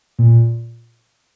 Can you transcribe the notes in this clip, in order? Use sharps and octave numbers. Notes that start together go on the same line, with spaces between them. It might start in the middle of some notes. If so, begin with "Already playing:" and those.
A#2